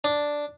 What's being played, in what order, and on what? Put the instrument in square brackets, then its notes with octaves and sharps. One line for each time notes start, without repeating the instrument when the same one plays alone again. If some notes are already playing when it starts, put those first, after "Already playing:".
[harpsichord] D4